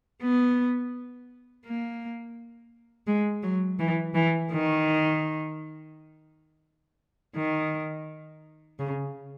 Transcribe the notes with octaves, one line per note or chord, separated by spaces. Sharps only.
B3
A#3
G#3
F#3
E3
E3
D#3
D#3
C#3